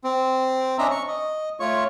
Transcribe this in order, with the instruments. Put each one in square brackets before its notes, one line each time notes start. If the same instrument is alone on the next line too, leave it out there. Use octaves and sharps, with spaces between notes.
[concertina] C4
C#4 D4 D#5 E5 A#5
C#6
D#5
A3 F4 C#5 C#6